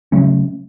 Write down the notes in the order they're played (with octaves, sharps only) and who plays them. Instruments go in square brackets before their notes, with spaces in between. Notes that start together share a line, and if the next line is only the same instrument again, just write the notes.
[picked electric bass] C#3 F#3 A3 C#4